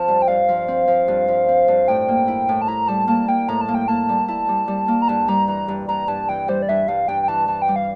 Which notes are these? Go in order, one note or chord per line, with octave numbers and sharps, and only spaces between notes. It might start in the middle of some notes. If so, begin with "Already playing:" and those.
Already playing: F3 C4 A5
G2
G5
G2 F5
F3
C4
F3
G2
F3
C4
G2
A2 G5
A#3
E4
A2
A5
E4 A#5
G3 A5
A#3 A5
A#3 G5
A2 A#5
A5
A#3
G5
A#3 A5
G3
E4 A5
G3
G3
A#3
A#5
G2 A5
G3 A#5
E3 A#5
G2
G2 A#5
G2 A5
E3 G5
G3 C5
D5
G2 E5
G2 F5
G2 G5
G5
E3 A5
E3 A5
G5
G3
F5